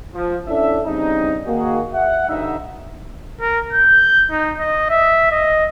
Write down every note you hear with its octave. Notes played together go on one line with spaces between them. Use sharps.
F3
C#4 D4 E4 A4 E5
C#3 G3 C4 D4 D#4
D#3 A#3 F#4 G#4
E5 F#5
D2 G2 D#4 E5
A#4
G6
D#4
D#5
E5
D#5